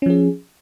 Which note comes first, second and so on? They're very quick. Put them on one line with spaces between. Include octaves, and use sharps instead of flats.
C#4 F3 G#4